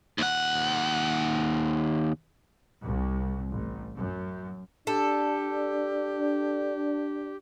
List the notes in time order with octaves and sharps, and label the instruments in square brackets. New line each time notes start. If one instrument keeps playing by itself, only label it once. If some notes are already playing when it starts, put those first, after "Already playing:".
[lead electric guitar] D#2 F#5
[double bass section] C2
A1
F#2
[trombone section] D4 [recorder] G4 [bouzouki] A4